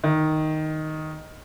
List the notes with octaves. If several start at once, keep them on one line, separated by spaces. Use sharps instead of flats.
D#3